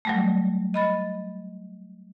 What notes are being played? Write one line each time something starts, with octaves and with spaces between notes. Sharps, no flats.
F#3 G3 A3
D#5 B5 A6